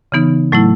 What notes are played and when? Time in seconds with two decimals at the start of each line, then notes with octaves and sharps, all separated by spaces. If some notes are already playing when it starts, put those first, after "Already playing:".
0.12 C#3 E3 B3 D#4
0.52 A2 F#3 A3 E4